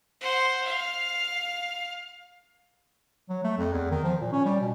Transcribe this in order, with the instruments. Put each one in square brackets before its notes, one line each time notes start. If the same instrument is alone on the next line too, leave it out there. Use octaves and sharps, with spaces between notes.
[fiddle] C5 F#5
F5
[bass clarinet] F#3
A3
F2
E2
D#3
F3
A#2
C#4
G3
B2